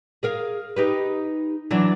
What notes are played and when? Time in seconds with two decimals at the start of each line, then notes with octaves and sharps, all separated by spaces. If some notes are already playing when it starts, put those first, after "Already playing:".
0.23 G#4 A#4 F5
0.76 D#4 G4 B4
1.71 E3 F#3 D4